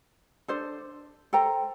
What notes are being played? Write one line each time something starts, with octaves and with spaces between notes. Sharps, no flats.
D4 A4 C5
A4 C5 G5 A#5